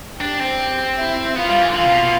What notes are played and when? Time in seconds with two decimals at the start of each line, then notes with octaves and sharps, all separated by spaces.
0.20 D4 G4 G5
0.40 C4
0.97 E4 E5
1.36 B3 F4 F5
1.49 G3
1.61 E3
1.69 D3
1.74 E3 F4 F5
1.84 C3
1.93 B2
2.03 B2